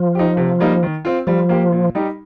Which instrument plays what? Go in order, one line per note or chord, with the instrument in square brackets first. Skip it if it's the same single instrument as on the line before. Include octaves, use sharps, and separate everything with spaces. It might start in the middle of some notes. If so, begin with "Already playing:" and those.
Already playing: [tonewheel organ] F3
[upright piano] D#4 G4
C3
G3 A#3 D#4
D#3
C4 F4
[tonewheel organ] F3 [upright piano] G3
[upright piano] A#3 G4
A#2
G3 D#4 G4